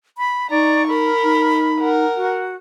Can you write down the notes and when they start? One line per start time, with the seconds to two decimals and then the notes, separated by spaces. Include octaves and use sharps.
0.18 B5
0.50 D#4 D5 A#5 C#6
0.88 A#4 B5
1.23 D#4
1.80 A#4 F#5
2.16 F#4